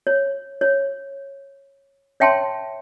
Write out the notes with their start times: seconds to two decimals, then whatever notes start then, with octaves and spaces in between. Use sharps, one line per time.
0.07 C#5
0.61 C#5
2.20 C#5 E5 G5 A5 C6